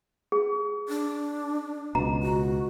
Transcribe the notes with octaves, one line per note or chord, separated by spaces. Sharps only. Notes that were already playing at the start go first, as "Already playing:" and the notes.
G#4
D4
C#2 B2 A#5
F#4